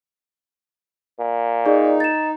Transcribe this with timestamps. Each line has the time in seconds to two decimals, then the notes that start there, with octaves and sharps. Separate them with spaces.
1.19 A#2
1.65 D#4 G#4 D5
2.00 A6 E7